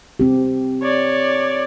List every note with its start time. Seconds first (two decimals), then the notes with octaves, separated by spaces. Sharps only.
0.20 C4 G4
0.82 C#5 D5